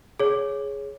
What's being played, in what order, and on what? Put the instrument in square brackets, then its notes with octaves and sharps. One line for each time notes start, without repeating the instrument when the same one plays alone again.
[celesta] G#4 C#5